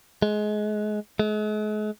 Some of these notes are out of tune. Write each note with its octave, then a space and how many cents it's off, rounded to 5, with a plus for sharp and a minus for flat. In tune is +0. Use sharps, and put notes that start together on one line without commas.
G#3 +25
G#3 +40